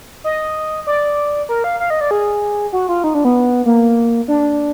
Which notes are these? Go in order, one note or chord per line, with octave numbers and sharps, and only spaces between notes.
D#5
D5
A#4
F5
F5
D#5
D5
G#4
F#4
F4
D#4
D4
B3
A#3
D4